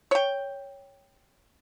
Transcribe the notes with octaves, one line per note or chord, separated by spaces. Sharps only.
C#5 G5